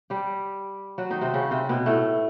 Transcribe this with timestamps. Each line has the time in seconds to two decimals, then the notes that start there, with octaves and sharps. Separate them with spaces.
0.10 G3 G4
0.98 F#3 F#4
1.10 D#3 D#4
1.21 C3 C4
1.34 C#3 C#4
1.51 C3 C4
1.69 B2 B3
1.86 A2 A3